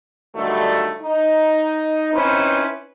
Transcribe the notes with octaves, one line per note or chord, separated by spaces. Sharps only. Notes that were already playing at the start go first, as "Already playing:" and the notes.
G2 D3 D#3 F#3 G3 A3
D#4
C4 C#4 D#4 E4 B4 C5